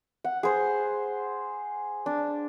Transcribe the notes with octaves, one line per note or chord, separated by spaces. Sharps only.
F#5
G#4 C5
D4